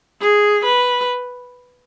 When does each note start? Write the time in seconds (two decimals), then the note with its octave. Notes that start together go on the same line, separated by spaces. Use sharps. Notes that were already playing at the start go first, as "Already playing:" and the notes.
0.21 G#4
0.65 B4